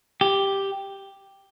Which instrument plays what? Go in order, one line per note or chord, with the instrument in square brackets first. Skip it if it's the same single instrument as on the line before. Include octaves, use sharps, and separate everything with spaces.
[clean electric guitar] G4